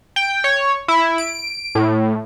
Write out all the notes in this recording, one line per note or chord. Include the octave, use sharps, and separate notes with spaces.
G5
C#5
E4
D7
A2